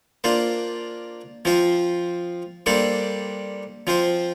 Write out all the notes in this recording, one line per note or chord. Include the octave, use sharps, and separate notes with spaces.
A#3 D4 F4 C5
F3 C4 F4 C5
G3 A#3 D4 A4 C5
F3 C4 F4 C5